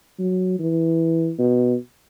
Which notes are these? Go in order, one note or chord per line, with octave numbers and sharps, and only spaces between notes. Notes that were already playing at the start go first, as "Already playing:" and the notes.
F#3
E3
B2